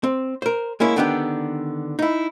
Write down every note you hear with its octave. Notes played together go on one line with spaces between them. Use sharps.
C4
A#4 C5
G#3 A#3 C#4 E4
D3 D#3 B3 D4 E4 G4
D#4 E4